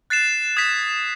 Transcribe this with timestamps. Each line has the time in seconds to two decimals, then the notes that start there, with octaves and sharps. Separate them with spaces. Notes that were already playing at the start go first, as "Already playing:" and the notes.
0.10 F#6 A6 C7 E7
0.57 D#6 G#6 B6 E7